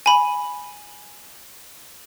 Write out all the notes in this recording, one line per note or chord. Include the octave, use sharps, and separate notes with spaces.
G#5 B5